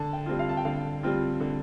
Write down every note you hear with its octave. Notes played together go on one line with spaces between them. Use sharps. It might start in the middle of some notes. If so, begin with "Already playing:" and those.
Already playing: D3 A5
G5
G3 C4 F4
F5
A5
G5
D3 F5
G3 C4 F4
D3